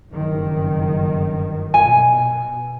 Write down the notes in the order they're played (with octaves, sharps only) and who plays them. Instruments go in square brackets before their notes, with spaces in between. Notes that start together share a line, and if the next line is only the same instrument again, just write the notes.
[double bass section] F#1 G2 D#3
[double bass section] B2 [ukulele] G#5